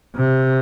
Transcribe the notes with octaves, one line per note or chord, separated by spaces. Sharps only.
C3